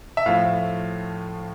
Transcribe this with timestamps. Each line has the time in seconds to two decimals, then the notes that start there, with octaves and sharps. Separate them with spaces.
0.17 E5
0.26 A2 F3 A3 F5